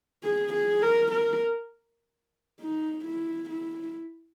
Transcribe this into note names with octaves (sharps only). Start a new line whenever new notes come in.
G#4
G#4
A#4
A#4
D#4
E4
E4